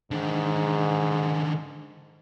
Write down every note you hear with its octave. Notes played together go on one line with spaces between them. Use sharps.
G#2 D3 D#3